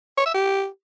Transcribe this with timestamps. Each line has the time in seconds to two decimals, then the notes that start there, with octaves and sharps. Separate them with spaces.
0.17 C#5
0.26 E5
0.34 G4